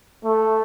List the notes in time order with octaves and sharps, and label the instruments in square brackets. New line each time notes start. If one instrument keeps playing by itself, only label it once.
[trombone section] A3